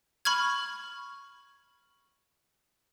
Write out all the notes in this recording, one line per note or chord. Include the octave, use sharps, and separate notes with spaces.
B5 C#6 F6 G#6